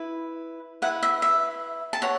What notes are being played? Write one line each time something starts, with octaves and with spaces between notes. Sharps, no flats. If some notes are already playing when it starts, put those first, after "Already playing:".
Already playing: E4 B4
E4 B4 F#5
E5
E5
A5
C#5 F#5